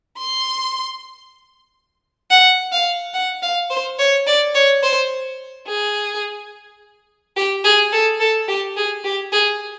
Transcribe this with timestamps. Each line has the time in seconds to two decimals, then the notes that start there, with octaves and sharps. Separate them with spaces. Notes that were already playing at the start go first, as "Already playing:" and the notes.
0.18 C6
2.30 F#5
2.72 F5
3.13 F#5
3.42 F5
3.70 C5
3.99 C#5
4.27 D5
4.55 C#5
4.83 C5
5.67 G#4
7.36 G4
7.64 G#4
7.92 A4
8.20 A4
8.48 G4
8.77 G#4
9.04 G4
9.32 G#4